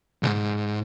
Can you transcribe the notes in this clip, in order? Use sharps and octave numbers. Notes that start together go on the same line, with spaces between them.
B1 G#2